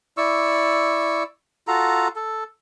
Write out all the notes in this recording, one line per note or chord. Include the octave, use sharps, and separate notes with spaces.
E4 D5 C#6 E6
F4 F#4 A4 A#5
A4